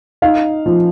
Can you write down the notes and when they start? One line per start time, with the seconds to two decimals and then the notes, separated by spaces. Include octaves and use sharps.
0.22 D#4 F5
0.66 F3